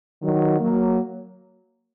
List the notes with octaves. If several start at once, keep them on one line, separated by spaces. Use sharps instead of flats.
D#3 F#3
F#3 A#3